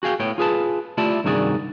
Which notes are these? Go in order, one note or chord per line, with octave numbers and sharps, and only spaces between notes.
F#4 G#4 F5 G5
A2 B3 C#5 G5
F4 G#4 B4 A5
A3 E4 F4 G4 D5 A5
C2 G2 D#3 F#4 G#4 D5